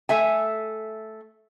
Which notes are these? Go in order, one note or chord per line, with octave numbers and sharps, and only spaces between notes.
A3 E5 G#5